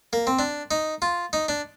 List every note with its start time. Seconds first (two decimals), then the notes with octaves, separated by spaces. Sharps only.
0.13 A#3
0.27 C4
0.39 D4
0.71 D#4
1.02 F4
1.33 D#4
1.48 D4